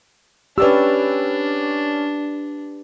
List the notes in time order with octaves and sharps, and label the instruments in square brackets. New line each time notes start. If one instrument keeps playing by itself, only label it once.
[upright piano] C#4 D5 E6 [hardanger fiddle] D4 [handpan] G4 B4